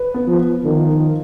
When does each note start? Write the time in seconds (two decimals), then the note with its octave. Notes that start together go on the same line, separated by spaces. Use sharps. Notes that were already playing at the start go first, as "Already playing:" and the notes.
Already playing: B4
0.14 B3
0.27 F3
0.39 B3
0.64 D#3 F3
0.89 F4